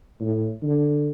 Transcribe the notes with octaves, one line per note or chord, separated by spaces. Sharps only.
A2
D3